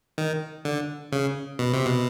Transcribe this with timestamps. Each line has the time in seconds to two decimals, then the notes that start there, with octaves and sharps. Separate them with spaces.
0.18 D#3
0.65 D3
1.12 C#3
1.59 B2
1.73 C3
1.86 B2